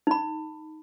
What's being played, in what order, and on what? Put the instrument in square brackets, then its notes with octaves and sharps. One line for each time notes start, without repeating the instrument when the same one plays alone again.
[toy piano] D#4 B5